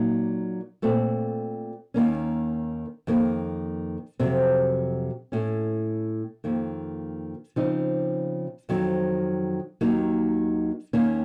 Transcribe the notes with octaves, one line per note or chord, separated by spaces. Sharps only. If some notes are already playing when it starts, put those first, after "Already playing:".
Already playing: A#2 F#3 A#3 D#4
A#2 A3 C4
D#2 D#3 A#3 C#4
F2 D#3 A#3
F2 C3 F#3 C4
A2 A3 C#4
F2 D#3 A#3
C#3 F3 C4 D#4
F2 D#3 F#3 C4
D#2 D#3 F#3 A#3 D#4
D#2 D#3 A#3 C#4